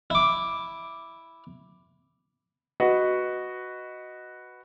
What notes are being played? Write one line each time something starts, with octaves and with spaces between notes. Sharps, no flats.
E4 D6
F#4 B4 D#5